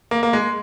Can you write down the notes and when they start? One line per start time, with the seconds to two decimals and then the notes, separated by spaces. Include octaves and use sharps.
0.11 A#3
0.23 A#3
0.33 G#3